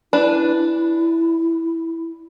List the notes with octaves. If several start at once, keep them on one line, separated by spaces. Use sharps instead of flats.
D4 E4 B4